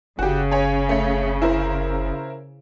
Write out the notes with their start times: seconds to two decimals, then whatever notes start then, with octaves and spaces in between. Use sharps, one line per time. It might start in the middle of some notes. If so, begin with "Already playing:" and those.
0.19 F#1 C#3 F#4 G4
0.51 C#5 G#5
0.89 A3 C#5
1.42 E4 A#4 C5